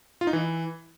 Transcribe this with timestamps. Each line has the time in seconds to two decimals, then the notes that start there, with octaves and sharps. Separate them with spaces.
0.21 F4
0.27 D#4
0.33 E3